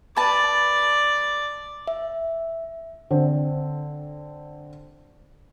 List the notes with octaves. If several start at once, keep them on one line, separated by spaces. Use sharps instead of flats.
B4 D5 A5
E5
D3 C4